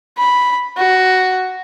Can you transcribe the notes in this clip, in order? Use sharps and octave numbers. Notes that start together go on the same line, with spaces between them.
B5
F#4